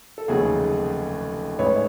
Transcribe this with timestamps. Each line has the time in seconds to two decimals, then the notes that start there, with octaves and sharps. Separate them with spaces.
0.18 A4
0.28 F1 D#2 C#3 F#3 F#4 G#4
1.59 A1 G#2 E3 B4 C#5